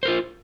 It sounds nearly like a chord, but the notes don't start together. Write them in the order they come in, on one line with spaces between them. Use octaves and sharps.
C5 A#4 F4